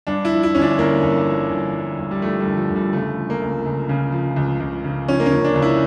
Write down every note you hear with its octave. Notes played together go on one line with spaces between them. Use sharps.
G2 D4
E4
F3
E4
G1 C#4
D4
G1 A#3
G2
F3
G1
G1
G2
G3
F3 A3
G1 G3
F3
G1
G3
C#3 A3
F3
A#3
C#2
C#2
C#3
F3
C#2
C#2
C#3
F3 C#4
A#3
C#4
C#2
D4
C#2
E4